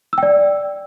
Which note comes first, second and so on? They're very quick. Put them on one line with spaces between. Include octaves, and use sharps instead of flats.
E6 G5 D5